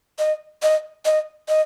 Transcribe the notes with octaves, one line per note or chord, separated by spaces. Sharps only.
D#5
D#5
D#5
D#5